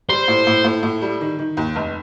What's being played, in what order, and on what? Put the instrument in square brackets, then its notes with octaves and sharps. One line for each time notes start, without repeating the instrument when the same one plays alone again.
[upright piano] G3 [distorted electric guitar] C5
[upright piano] A2
A2
A2
A2
G3
D#3
D#3
D#2
F1